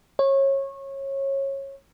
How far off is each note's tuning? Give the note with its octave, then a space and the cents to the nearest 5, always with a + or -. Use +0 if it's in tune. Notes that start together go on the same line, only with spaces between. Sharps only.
C#5 -25